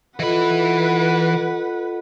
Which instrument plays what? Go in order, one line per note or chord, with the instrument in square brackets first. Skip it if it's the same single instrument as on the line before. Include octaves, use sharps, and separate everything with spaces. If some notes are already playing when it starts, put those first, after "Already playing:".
[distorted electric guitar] E3 B5 [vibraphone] F4 A4 D#5 [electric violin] B4 F#5